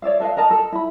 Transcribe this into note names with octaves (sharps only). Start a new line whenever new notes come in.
C#5 D5 E5 F5
A4 B4 D#5 F5
A#4 D#5 A5 A#5
A4
E4 B5